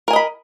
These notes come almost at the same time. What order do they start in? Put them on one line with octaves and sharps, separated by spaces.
A#4 G#5 D#5 B5